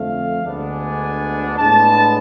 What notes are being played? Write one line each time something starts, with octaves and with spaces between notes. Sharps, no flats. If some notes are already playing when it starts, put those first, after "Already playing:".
Already playing: F2 D3 A3 F5
D2 D3 G#3 B3 D4
G#5
A2 G#3 B3 D4 A5